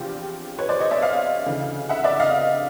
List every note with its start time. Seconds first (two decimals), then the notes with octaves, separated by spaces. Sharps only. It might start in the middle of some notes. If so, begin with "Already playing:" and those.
Already playing: E2 C3 F3 D4 F4 G4
0.59 B4 C#5
0.69 C5 D5
0.80 C#5 D#5
0.91 D5 E5
1.02 D#5 F5
1.46 D2 C#3 E3
1.89 E5 F#5
2.04 D5 E5
2.20 D#5 F5